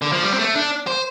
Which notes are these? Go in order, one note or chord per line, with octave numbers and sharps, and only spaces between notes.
D3
F3
G3
C4
A3
D4
C5